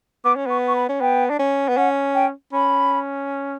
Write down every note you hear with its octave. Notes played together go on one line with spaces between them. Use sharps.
B3 D6
C#4
B3 C#6
C#6
B5
C#4
B3 G5
D4
C#4
B3
C#4 F#5
G5
C#4 B5